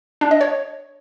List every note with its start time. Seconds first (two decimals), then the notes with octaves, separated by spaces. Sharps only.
0.21 D4
0.31 D#5
0.41 C#5